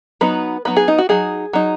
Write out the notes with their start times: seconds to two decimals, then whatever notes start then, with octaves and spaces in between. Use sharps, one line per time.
0.21 F#3 B3 D#4 B4
0.65 F#3 B3 D#4 B4
0.77 G#4
0.88 D#4
0.98 F#4
1.09 F#3 D#4 G#4
1.53 F#3 D#4